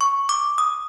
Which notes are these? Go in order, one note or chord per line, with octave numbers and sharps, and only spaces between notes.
C#6
D6
D#6